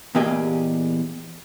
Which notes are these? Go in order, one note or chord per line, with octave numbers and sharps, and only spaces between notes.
E2 A#2 A#3 G4 G#4 D#5